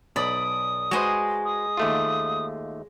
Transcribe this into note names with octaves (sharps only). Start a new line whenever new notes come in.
B1 D5 B5 D#6
G#3 F#4 B4 C5 D#5
D#6
D#2 A3 F4